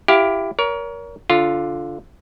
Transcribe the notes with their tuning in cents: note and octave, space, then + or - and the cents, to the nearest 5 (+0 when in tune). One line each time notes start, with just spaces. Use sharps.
E4 +20 G4 +0 F5 +20
A#4 +20 C#5 +35
D3 -10 F4 +0